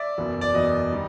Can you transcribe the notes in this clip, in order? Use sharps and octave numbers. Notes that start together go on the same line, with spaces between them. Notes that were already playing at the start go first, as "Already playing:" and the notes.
Already playing: D5 E5
F#1 E2 B2
D5
F#1 E2 B2 D#5
D#3 G3